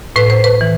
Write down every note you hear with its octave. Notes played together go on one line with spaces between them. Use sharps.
A2 B4
C5
B4
E3